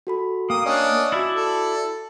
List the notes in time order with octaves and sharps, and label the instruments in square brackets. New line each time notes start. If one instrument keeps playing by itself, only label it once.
[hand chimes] F#4 A4 B5
[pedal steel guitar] A#3 [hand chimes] F5 G5 A#5 [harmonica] D#6
[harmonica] C#4 D4 D#6 [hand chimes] D5 D#5 F5
[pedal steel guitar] E4 D5 E5 [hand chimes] F#4 B5 E6
[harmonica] A4